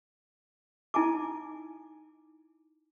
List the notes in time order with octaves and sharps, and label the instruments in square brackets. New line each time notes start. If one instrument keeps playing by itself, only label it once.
[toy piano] D#4 E4 G#5 A5 D6